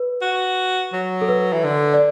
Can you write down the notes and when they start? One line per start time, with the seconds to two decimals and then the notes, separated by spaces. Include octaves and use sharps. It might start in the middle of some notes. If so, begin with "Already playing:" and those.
Already playing: B4
0.22 F#4
0.93 F#3
1.22 A4
1.29 B4
1.53 E3
1.64 D3
1.94 D5